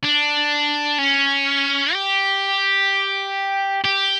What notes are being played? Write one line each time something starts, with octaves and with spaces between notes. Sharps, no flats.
D4
C#4
G4
G4